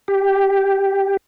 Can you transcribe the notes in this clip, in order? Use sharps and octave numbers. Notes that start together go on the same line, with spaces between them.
G4